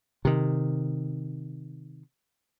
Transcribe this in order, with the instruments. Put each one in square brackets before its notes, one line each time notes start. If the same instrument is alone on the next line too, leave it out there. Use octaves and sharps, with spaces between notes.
[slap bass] C3 D#3